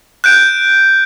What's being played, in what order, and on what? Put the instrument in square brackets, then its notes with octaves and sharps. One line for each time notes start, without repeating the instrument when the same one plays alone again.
[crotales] F#6 G6 D7